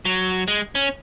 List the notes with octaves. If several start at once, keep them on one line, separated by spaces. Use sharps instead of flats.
F#3
G#3
C#4